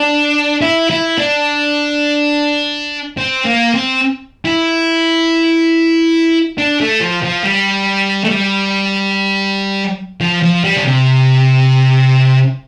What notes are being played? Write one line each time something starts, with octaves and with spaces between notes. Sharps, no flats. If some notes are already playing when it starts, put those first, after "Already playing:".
Already playing: D4
E4
E4
D4
C4
A#3
C4
E4
D4
A3
F3
F3
G3
A3
G3
F3
F3
G3
D3
C3